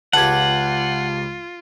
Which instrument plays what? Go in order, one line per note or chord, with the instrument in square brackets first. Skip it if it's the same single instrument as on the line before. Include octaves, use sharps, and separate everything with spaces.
[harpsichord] C#2 G4 [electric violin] F4 [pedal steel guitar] F#5 [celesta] A5 G#6